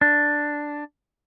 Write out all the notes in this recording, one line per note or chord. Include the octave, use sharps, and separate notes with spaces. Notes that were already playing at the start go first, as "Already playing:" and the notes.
D4